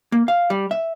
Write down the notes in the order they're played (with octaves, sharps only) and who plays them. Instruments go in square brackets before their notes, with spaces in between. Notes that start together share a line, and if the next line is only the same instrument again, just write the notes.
[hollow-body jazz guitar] A#3
F5
G3
E5